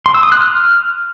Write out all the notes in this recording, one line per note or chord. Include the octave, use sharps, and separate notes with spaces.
C6
E6
D#6
F#6
F6